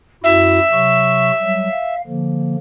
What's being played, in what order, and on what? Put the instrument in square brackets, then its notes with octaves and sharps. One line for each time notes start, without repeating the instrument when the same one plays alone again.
[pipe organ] F#2 E4 F#4 [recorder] E5
[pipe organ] C3 F#3 C#6
F#3 G3
F5
D3 F3 A#3